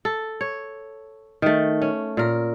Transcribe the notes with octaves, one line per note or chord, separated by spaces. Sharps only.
A4
C#5
D#3 A3
C#4
A#2 A#4